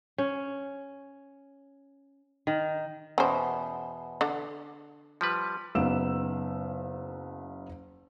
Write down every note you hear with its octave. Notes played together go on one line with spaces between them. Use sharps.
C#4
D#3
E2 B2 C#4 C5
D3
F3 G3 B4
F#1 B3 D#4 F5 E6 E7